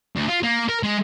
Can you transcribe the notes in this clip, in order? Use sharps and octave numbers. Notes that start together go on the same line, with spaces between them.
D2
F4
A#3
A#4
G#3